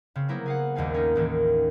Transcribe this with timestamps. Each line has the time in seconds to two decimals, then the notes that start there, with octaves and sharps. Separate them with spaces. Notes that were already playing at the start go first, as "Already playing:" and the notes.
0.15 C#3 C4
0.28 F#3 A#3 B3 E4 C5
0.46 G#4 F5 F#5
0.75 G#1 D#2 G3 F5 G#5
0.94 C#4 D#4
1.16 A1 D#2 A2 D#3